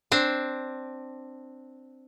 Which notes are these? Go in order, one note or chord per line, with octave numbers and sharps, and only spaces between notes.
C4 D4